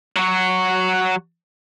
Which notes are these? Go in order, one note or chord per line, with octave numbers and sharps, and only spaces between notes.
F#3 F#4